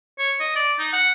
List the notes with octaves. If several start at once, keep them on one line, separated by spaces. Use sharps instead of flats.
C#5
D#5
D5
D#4
F#5